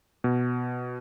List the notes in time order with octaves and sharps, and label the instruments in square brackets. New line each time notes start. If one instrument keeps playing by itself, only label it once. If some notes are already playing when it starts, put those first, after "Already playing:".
[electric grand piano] B2